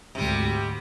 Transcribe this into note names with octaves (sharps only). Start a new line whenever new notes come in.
D2 G#2 C3 G3